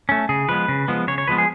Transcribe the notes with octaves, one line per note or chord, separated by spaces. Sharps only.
A3 C#4
C#3 G#4
F3 G#3 B3 B4
C#3
F3 G#3 B3
C#3 C#5
C#5
F3 G#3 B3 B4
G#4